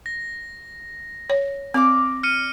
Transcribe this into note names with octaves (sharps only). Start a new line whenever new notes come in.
A#6
C#5
C4 D5 F5 D6
F6 C#7 D#7